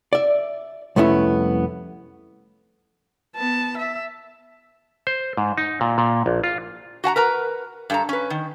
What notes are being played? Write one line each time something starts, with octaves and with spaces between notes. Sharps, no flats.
D5 E5
C2 F2 A3 B3 C#4 E4
B3 A5
E5
C5
G#2
D#4
A#2
A#2
A#1
F4
F#4 F#5 A5 A#5
A#4 B4 A#5
G2 A4 A#5
C#4 B4
D#3